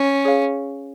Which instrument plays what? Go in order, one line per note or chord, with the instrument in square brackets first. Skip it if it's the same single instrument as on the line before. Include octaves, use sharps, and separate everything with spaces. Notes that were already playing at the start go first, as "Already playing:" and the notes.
Already playing: [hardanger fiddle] C#4
[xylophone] G#4 C#5 F5